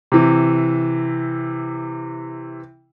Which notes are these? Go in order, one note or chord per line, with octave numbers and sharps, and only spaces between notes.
C3 E3